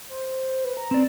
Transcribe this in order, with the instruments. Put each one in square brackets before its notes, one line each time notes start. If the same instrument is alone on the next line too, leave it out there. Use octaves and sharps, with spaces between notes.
[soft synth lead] C5
B4
A#5
[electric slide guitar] C4 D5